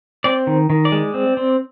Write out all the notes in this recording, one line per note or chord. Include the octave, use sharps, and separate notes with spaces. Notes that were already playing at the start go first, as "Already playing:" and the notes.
C4 D5
D#3
D#3
D5
G#3
C4
C4